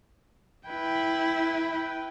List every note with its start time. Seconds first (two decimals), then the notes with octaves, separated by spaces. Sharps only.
0.68 E4 B4 G5